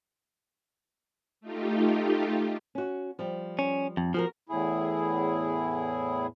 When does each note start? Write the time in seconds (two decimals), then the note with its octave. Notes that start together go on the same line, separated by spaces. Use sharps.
1.41 A3 D#4 F4 G4
2.75 C#4 F#4
3.19 F3 G3
3.59 C#4
3.97 F2
4.14 F3 F#4 G#4 A#4
4.49 E2 A2 E4 G#4